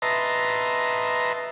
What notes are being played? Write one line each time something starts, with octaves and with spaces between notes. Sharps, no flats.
B4 D#5 E5 A5 A#5 C6